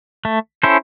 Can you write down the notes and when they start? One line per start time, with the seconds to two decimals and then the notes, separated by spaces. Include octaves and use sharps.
0.25 A3
0.63 C#4 E4 A4 C5